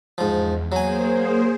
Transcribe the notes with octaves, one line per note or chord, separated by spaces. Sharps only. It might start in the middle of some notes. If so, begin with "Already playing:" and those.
E2 G#2 F3
F#3 A#3 G#4 C5 G#5